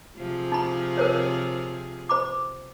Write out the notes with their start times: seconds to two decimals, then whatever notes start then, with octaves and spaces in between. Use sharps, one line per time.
0.17 C3 F3 G#4
0.52 D#4 B5
0.98 A#4 C5 C#5
2.09 C5 B5 D6